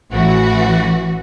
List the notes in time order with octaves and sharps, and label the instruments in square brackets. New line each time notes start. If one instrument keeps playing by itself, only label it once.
[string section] A1 E3 F#4